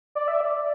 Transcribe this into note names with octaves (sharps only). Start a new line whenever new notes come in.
D5
E5
D5